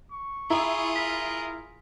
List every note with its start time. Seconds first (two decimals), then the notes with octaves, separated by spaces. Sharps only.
0.11 C#6
0.50 E4 F4 G#4 A#5
0.96 A#4 B6